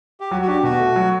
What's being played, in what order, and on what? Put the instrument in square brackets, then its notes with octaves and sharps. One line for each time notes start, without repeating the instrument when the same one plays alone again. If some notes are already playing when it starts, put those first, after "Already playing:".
[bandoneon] G4
[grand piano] F#3 [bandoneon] F#4
[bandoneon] F#4
[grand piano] D4 [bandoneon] G4
[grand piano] B2 [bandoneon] F#4
[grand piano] A3
F#3